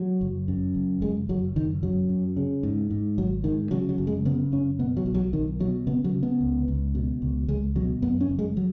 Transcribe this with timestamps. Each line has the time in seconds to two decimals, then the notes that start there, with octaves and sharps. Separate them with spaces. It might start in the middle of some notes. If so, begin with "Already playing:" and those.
Already playing: F#3
0.21 F#1
0.48 F#2
0.75 F#1
1.01 F#1 G#3
1.29 F#1 F#3
1.56 F#1 D#3
1.83 F#2 F#3
2.09 F#2
2.37 C#3
2.63 G#2
2.91 G#2
3.18 G#1 F#3
3.44 G#2 D#3
3.71 C#3 F#3
3.89 F#3
3.98 F#1
4.07 G#3
4.25 C#3 B3
4.52 F#1 C#4
4.79 B2 B3
4.97 F#3
5.06 B1
5.14 F#3
5.33 B1 D#3
5.60 B2 F#3
5.87 C#3 B3
6.04 F#3
6.13 C#3
6.23 B3
6.41 C#2
6.68 C#2
6.95 B2
7.22 C#2
7.48 C#2 G#3
7.76 B2 F#3
8.02 F#2 B3
8.21 C#4
8.29 F#1
8.39 G#3
8.57 F#3